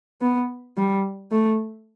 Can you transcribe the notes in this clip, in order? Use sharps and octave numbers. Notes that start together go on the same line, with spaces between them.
B3
G3
A3